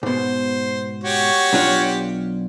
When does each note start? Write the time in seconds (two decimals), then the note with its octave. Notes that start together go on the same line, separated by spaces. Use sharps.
0.03 G#2 B2 C5
1.04 F#4 G4 C#5
1.53 B1 D4 F4